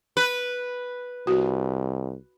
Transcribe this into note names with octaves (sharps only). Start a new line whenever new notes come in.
B4
C2 F#4